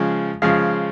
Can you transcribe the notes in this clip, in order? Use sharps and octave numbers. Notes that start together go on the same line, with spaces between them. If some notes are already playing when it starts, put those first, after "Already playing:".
Already playing: C#3 F3 G#3
C#3 F3 G#3 F5